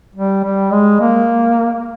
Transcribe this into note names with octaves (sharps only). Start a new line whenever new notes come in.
G3
G3
G#3
A#3